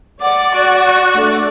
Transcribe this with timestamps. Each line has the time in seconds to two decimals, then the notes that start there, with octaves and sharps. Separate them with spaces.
0.22 D5 F#5 D6
0.55 F#4
1.14 A3 D4 D5